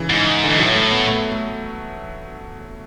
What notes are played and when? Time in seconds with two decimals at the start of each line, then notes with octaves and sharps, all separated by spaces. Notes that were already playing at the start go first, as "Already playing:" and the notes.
Already playing: C#3 E3
0.09 G#2
0.44 D3
0.49 G#2 E3
0.58 A2 F#3
0.75 A3
0.91 B3
1.08 A3
1.32 A3